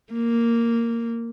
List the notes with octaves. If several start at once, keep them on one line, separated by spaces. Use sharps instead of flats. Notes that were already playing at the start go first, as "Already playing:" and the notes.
A#3